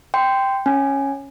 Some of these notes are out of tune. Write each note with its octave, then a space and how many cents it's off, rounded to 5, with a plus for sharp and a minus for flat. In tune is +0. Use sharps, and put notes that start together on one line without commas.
G5 +0 C6 -20
C#4 -10 G#5 +0